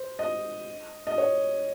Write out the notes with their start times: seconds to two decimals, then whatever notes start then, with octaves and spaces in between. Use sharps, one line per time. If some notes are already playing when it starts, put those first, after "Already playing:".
Already playing: C5
0.19 D#5
1.07 D#5
1.18 C#5